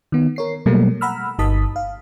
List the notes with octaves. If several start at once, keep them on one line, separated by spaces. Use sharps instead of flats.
D#3 B3
A#4 C#5 C7
B2 F#3 G3 A3 A#3
F#5 A#5 B5 E6 F6
G1 D#4 A5 D#6 B6
F5